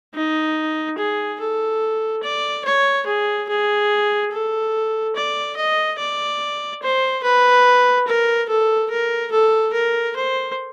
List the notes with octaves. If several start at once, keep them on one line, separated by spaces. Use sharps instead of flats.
D#4
G#4
A4
D5
C#5
G#4
G#4
A4
D5
D#5
D5
C5
B4
A#4
A4
A#4
A4
A#4
C5